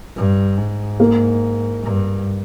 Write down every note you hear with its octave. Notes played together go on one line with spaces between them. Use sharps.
G2
G#2
A#3
G2